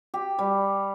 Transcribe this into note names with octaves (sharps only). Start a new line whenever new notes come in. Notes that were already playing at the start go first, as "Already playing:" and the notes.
G4
G3